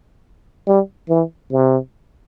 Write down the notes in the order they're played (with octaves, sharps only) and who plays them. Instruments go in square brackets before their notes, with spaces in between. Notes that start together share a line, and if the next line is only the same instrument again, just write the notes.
[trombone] G3
E3
C3